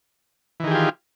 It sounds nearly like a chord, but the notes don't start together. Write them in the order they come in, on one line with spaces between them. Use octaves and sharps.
E3 D#3 G#4 G4 F4